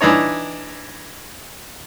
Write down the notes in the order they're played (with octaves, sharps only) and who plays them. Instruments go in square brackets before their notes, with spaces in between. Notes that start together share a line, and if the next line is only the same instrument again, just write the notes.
[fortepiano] E3 D4 D#4 C#5